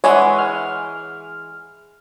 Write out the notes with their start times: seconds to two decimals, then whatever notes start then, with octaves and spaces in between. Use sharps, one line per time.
0.04 E3 G#3 G#4 C#5 E5 F#5
0.38 F6